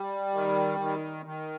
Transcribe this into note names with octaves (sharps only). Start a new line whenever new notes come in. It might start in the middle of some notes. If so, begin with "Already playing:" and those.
Already playing: G3
D#3
D#3
D#3